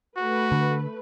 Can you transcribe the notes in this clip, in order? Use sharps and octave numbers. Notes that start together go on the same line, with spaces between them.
A3 F#4 B4
D3